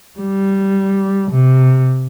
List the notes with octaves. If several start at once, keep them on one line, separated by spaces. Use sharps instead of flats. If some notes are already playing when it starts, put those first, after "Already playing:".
G3
C3